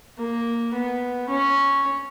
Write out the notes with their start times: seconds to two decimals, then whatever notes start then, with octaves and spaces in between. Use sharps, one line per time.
0.18 A#3
0.74 B3
1.29 C#4